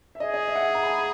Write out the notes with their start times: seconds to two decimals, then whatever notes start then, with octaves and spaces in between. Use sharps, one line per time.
0.15 E5
0.20 G#4 D#5
0.34 D#5
0.47 E5
0.56 F#5
0.62 G#5
0.75 A#5
0.83 B5
0.91 A#5
0.98 B5